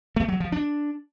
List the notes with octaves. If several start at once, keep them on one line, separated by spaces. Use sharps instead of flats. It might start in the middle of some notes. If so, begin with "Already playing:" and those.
A3
F#3
F3
D4